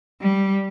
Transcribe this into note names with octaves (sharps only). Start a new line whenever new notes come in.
G3